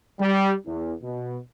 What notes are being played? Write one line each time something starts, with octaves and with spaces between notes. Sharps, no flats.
G3
E2
B2